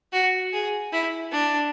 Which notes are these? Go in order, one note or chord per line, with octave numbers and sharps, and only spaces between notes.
F#4
G#4
E4
D4